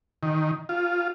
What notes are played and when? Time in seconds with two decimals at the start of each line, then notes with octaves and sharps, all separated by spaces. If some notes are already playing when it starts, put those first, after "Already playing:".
0.23 D#3
0.69 F4